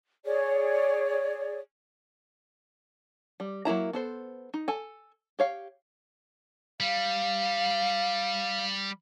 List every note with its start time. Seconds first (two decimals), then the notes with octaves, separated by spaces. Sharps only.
0.25 G#4 C#5 D5
3.40 G3
3.65 F#3 A#3 E4 A#5
3.93 B3 A4 C5
4.54 D#4
4.68 A4 G#5
5.39 G4 C#5 F5
6.80 G3 F5